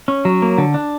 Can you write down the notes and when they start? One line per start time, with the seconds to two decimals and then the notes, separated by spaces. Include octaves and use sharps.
0.08 C#4
0.25 F#3
0.42 A#3
0.58 D3
0.74 D4